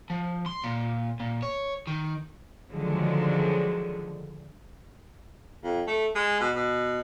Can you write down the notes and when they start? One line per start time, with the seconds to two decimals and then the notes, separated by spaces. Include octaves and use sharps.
0.10 F3
0.46 C6
0.64 A#2
1.20 A#2
1.42 C#5
1.87 D#3
2.71 D3 D#3 F3 F#3 G#3
5.63 F2
5.87 A3
6.15 G#3
6.40 B2
6.55 B2